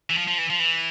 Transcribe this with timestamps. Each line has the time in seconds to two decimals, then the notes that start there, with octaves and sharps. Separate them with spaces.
0.10 E3
0.17 F3
0.27 F3
0.38 E3
0.50 F3
0.59 E3